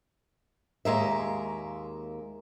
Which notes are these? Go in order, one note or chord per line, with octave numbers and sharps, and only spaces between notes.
D#2 G#3 A#3 E5